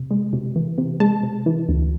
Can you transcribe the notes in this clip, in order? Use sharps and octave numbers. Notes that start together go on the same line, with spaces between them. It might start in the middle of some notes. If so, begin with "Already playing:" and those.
Already playing: C3
G#3
C3
E3
C3
G#3 A5
C3
E3
D2